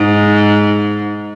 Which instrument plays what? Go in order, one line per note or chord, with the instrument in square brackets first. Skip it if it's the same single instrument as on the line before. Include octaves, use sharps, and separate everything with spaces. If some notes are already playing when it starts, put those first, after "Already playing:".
Already playing: [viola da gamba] G#2